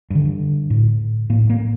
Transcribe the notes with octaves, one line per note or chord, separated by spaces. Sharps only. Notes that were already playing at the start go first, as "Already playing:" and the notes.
G2 D3
A2
A2 A#3
A#3